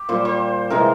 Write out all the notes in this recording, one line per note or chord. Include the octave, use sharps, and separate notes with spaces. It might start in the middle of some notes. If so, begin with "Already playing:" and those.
Already playing: G4
A#2 G3 C5
C5
C3 E3 G#3 A#4